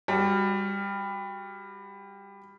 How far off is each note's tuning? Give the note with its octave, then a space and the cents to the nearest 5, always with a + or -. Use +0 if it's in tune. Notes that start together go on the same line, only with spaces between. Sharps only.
G3 +20 F#4 +0